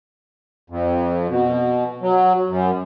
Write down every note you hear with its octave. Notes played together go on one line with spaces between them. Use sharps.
F2
B2
F#3
F#2